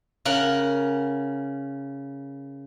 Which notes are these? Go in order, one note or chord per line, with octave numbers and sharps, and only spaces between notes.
C#3 A#4 F#5